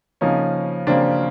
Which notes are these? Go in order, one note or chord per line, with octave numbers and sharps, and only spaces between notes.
C#3 F3 A#3 C#4 D#4
C#3 F3 A#3 C4 D4